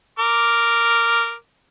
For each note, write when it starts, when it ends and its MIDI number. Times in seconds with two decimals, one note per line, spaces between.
0.19 1.33 70
0.19 1.33 86